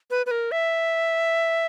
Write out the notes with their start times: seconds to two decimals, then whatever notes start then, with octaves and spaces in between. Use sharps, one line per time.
0.11 B4
0.26 B4
0.31 A#4
0.52 E5